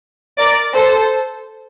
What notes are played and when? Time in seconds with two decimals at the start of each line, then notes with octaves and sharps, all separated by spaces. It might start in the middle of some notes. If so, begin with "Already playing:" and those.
0.38 A#4 D5
0.73 A4 C5